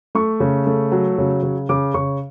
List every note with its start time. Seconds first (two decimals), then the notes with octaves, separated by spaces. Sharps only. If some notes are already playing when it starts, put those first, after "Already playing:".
0.15 A3 C#6
0.40 C#3
0.67 A3
0.92 F#3
1.18 C#3
1.43 C#3
1.69 C#3 D6
1.94 C#3 C#6